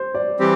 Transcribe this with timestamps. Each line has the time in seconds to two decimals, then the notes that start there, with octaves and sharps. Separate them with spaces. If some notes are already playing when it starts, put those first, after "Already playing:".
Already playing: C5
0.15 D5
0.40 E3 G3 C4 G4